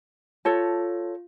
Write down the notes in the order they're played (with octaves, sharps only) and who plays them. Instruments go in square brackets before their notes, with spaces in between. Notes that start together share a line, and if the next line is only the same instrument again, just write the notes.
[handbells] F4 [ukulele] A4 C#5 A5